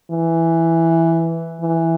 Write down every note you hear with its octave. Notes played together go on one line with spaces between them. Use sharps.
E3
E3